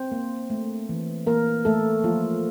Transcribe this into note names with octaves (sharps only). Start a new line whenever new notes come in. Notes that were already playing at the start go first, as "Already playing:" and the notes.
Already playing: C4 C5
A#3
A3
E3
E3 A#3 A#4
E3 A3 A4
F3 A#3 F4